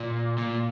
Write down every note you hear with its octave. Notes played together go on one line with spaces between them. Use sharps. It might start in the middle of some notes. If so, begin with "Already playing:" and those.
Already playing: A#2
A#2